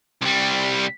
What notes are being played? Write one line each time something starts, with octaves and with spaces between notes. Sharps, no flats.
C2 G3